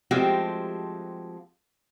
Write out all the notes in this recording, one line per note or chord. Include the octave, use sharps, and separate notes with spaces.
F3 G#3 A3 C4 F#4 G4